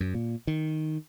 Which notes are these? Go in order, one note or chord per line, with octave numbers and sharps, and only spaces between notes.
F#2
A#2
D#3